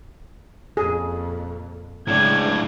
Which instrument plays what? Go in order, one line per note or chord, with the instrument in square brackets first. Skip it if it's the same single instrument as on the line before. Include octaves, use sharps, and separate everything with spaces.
[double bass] F2 A#2 [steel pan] G#4
[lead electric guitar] A2 D4 [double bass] C#3 G#3 [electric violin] G#6